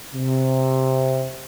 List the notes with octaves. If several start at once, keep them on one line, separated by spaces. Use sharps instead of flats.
C3